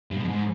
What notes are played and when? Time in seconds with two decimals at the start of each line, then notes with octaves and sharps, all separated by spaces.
0.11 G2
0.17 B2
0.22 F2
0.28 G#2